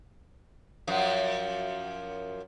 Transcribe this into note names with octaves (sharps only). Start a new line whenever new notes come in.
F#2 F3